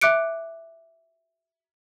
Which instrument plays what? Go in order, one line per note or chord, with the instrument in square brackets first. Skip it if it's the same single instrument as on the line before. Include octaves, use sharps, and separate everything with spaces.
[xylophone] E5 D6 F#6 C#7 D7